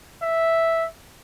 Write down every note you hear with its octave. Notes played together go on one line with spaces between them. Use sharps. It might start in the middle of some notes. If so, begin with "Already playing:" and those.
E5